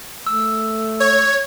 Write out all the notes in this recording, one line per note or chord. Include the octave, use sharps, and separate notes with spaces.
A3 E6
C#5 G#6